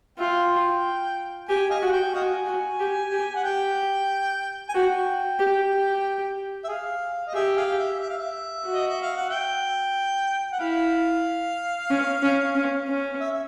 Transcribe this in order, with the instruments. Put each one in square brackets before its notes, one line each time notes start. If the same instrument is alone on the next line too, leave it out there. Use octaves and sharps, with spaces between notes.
[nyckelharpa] F4 [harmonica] E5 G5
[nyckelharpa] G4 [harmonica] G#5
[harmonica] D#5 F5 G#5
[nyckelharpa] F#4
[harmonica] G5
[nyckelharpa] F#4 [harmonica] D#5 F5 G#5
[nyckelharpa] F#4
G4
G4
[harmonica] F#5
[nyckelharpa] G4 [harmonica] G5
[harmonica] G#5
[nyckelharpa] F#4 [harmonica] G5
[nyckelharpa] G4
G4
[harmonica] E5
G#4 F5
D#5
[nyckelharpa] G4 [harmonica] G#4 E5
[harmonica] G#4 F5
E5
E5
F5
E5
[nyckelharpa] F#4
[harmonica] D#5
E5
F5
F#5
E5 G5
F#5
[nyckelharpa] E4 [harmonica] F5
[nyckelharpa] C#4
C#4
C#4
C#4
[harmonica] E5
E5